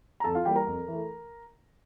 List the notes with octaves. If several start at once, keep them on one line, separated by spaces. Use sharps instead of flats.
A#5
F2 A4 A5
F4 F5
E3 G3 A#3 G4 G5
A#4 A#5
F2
E3 A3